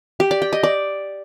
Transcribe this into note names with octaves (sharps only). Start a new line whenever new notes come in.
G4
D5
G5
D#5
D5